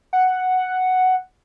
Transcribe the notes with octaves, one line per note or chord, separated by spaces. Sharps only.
F#5